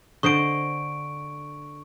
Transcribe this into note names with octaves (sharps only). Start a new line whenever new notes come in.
D3 C5 D#5 C#6 D7